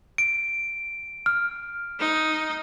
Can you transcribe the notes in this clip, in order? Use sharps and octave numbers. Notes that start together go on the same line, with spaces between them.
D7
F6
D#4